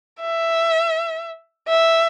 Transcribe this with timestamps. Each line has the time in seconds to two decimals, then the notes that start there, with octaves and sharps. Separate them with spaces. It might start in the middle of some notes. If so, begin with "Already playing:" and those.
0.21 E5
1.68 E5